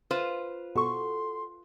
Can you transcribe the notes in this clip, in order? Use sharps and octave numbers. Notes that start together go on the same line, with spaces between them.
F4 B4 C5
B2 F#4 A4 C6 C#6